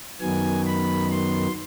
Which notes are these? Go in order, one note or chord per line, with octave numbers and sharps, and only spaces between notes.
F#2 D#3 F#3 B3 G#5
B5
C6